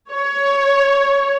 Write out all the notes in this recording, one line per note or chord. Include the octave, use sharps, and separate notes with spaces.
C#5